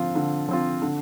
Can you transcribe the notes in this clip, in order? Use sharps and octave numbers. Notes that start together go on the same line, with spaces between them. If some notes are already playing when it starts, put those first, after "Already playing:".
Already playing: D3 F3 C4 F4
D3
F3 C4 F4
D3